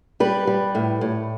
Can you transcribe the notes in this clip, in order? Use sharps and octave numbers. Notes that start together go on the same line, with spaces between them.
G3 B4
G3
A2
A2